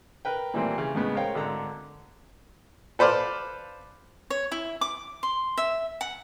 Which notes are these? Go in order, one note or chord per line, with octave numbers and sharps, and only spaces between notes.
A#4 B4 G5
A#2 E3 G3 A3 A#3 C4
C#3 E3
A2 C#3 G#3 B3
A#4 C5 C#5 F5 G5
G#1 D3 A4 A#5
A4 B4 C5 D5 F5
C#5
E4
D6
C6
E5
F#5